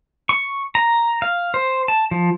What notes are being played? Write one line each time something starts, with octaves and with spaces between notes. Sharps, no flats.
C#6
A#5
F5
C5
A5
F3